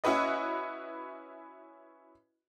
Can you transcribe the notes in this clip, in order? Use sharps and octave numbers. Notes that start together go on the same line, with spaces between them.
C#4 E4 F#4 B4 D#5